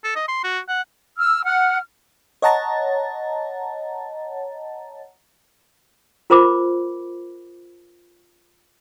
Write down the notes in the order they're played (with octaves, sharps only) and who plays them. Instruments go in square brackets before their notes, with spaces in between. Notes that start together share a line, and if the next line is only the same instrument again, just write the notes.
[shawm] A4
D#5
C6
F#4
F#5
[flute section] E6 F6
F#5 F6
[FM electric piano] C#5 D#5 F#5 A5 A#5 A6
[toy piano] F4 A#4 C5 B5 D6